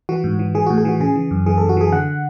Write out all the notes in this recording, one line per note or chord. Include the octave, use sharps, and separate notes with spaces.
E3 F#4
G#2
E3
E3 G#4
A2 F#4
G#4
E3 F#4
C#3 G#4
E3
F#2
E3 G#4
F#2 A4
F#4
E3 G#4
D3 F#5